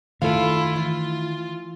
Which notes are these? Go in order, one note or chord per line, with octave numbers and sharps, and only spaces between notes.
D#2 D#3 A3 E4 F4 A4 F5
E3 F4